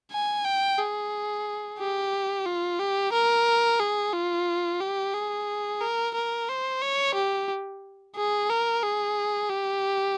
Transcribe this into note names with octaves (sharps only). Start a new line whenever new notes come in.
G#5
G5
G#4
G4
F4
G4
A#4
G#4
F4
G4
G#4
A#4
A#4
C5
C#5
G4
G#4
A#4
G#4
G4